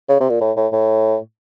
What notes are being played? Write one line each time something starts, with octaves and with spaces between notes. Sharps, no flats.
C#3
C3
A#2
A2
A2
A2